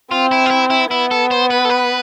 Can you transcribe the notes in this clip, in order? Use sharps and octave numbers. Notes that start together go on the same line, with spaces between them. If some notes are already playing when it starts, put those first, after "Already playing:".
C4 F4
E4
F4
E4
E4
B3 E4
A4
C5
B4
A4
B4